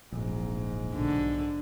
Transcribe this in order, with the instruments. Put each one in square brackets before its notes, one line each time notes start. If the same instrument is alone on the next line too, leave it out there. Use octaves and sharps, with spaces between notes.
[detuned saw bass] D1 [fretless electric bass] A#1 [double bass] G#2
[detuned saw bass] B1 [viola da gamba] D3